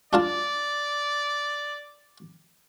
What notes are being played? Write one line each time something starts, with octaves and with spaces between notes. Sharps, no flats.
D4 F4 D5 A5